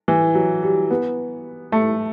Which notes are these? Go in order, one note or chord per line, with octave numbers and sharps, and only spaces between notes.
E3
F#3
G3
B3
A3